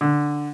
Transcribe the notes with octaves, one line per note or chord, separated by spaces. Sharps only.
D3